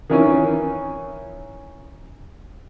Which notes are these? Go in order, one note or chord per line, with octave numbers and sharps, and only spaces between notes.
D#3 E3 C#4